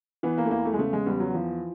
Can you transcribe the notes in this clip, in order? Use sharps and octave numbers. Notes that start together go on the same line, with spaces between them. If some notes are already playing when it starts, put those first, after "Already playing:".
E3 B3
A#3
A3
E2 A#3
A3
G#3
C#3 A3
G#3
E2 G3
F#3
E3 F3